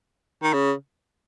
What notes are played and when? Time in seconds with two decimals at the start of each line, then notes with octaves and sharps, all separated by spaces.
0.43 D#3
0.53 C#3